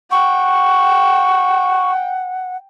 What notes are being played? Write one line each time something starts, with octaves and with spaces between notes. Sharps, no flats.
F#5 G5 C#6